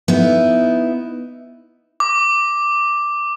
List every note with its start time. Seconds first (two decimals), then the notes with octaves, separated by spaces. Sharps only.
0.08 B3 D#4 E4
2.00 D6